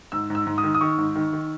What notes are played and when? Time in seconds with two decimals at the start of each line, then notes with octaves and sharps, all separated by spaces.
0.12 G#2 E6
0.30 G#2
0.35 E6
0.47 G#2
0.58 D#6
0.63 D#3
0.75 D#6
0.81 D#3 C#6
0.98 G#2
1.15 D#3
1.33 D#3